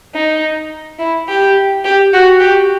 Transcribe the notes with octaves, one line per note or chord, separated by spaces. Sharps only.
D#4
E4
G4
G4
F#4
G4